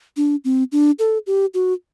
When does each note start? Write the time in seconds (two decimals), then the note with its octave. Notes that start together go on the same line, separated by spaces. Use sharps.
0.17 D4
0.44 C4
0.72 D4
0.99 A4
1.27 G4
1.54 F#4